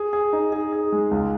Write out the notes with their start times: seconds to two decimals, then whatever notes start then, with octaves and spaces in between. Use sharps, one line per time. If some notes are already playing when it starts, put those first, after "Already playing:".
Already playing: G#4
0.13 G#4
0.33 D#4
0.52 G#4
0.73 G#4
0.92 G#3
1.11 C#2